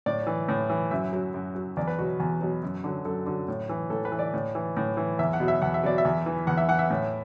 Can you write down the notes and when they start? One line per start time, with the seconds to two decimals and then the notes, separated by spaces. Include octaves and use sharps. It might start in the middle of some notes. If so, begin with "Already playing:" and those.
0.06 A2 D5
0.27 E3
0.48 A2
0.70 E3
0.91 F#2 E5
1.13 F#3
1.34 F#2
1.55 F#3
1.77 E2 D5
1.88 B4
1.98 B2 F#4
2.01 F#3
2.20 E2
2.41 B2 F#3
2.63 F#2
2.84 D3 F#3
3.05 F#2 A4
3.26 D3 F#3
3.48 A2
3.69 E3
3.90 A2 A4
4.05 B4
4.12 E3
4.19 D5
4.34 A2
4.55 E3
4.77 A2
4.97 E3
5.19 E2 E5
5.33 F#5
5.40 B2 F#3
5.48 E5
5.62 E2 F#5
5.74 E5
5.83 B2 F#3 D5
5.98 E5
6.05 E2
6.26 E3
6.47 E2 F#5
6.57 E5
6.68 E3 F#5
6.79 E5
6.90 A2